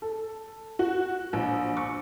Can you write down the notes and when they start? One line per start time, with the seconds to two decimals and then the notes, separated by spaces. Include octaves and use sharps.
0.02 A4
0.79 F#4
1.33 A#1
1.77 C#6